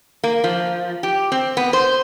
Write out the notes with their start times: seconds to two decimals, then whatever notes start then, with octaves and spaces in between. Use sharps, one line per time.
0.24 A#3
0.44 F3
1.03 G4
1.32 C4
1.57 B3
1.73 C5